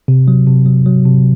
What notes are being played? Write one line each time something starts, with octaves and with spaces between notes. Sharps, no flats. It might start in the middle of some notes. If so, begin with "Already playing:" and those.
C3
F#3
C3
F#3
F#3
C3